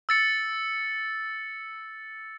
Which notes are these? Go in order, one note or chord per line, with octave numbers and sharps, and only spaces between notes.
E6 A6 C#7